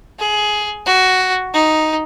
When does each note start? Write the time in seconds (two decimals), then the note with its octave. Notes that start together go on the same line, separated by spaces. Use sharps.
0.19 G#4
0.86 F#4
1.54 D#4